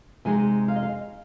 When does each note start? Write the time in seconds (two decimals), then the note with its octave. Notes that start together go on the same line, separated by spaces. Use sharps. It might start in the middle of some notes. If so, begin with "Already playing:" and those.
0.25 C3 G#3 D#4 G#5
0.68 F5
0.76 D#5
0.83 F5